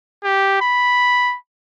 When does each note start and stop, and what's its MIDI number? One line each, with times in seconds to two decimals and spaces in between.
0.24 0.61 67
0.61 1.37 83